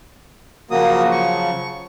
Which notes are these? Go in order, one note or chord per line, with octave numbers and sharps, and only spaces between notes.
C#3 F3 F#3 A#3 F#4 D#6
C#6